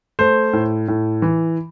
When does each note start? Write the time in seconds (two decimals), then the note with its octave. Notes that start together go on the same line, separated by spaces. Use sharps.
0.19 A3 C5
0.53 A2
0.88 A2
1.22 E3